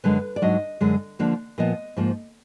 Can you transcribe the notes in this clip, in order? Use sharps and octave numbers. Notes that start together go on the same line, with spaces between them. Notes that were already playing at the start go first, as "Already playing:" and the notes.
F#2 D3 G#3 B4
D5
G#2 F#3 D4 D#5
F#2 D3 G#3
D3 F3 A#3 D4
A#2 F3 B3 D#5
G#2 F3 A#3